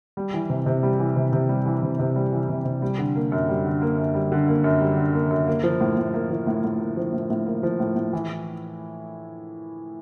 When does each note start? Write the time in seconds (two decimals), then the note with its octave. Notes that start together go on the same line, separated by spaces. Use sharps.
0.17 G3
0.34 E3
0.50 C3
0.66 C3
0.83 G3
0.99 E3
1.16 C3
1.33 C3
1.49 G3
1.66 E3
1.83 C3
1.99 C3
2.16 G3
2.33 E3
2.49 C3
2.65 C3
2.82 G3
2.98 D3
3.15 A#3
3.32 F#2
3.49 G3
3.65 D3
3.82 A#3
3.98 F#2
4.14 G3
4.32 D3
4.48 A#3
4.64 F#2
4.81 G3
4.97 D3
5.14 A#3
5.31 F#2
5.47 A#3
5.64 F3
5.81 A2
5.97 A2
6.14 A#3
6.30 F3
6.47 A2
6.64 A2
6.80 A#3
6.97 F3
7.13 A2
7.30 A2
7.46 A#3
7.63 F3
7.80 A2
7.96 A2
8.13 E3